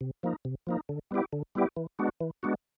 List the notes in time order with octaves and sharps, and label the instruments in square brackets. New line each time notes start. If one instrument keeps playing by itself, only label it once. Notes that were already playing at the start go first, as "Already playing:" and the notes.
[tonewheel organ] C3
F3 A#3 D#4
C3
F3 A#3 D#4
D3
G3 B3 E4 G4
D3
G3 B3 E4 G4
E3
G#3 B3 D4 F#4
E3
G#3 B3 D4 F#4